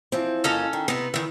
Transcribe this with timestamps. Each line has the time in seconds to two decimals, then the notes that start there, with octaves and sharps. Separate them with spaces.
0.12 E3 F3 C4
0.44 F2 F3 A#3 C#4 A4 D#5
0.73 D#3
0.88 C3 B3 D#4
1.14 D#3 E3 E5